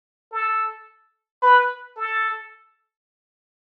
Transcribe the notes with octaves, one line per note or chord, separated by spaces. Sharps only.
A4
B4
A4